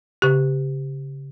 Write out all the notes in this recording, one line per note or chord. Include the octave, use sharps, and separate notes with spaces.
C#3 G4